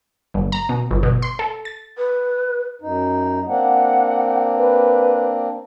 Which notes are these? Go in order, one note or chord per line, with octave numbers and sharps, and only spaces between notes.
G1
A#5
B2
G1
B2
C6
A4
A6
B4
F#2 D#4
A#3 C4 D4 F#5
B4